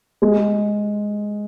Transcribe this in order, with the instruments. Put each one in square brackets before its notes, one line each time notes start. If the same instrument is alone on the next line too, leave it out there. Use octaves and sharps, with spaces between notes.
[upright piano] G#3